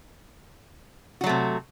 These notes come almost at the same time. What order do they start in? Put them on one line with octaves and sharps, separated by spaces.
F#4 F#3 A3 C3